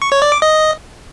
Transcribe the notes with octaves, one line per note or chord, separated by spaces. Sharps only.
C#6
C#5
D5
D6
D#5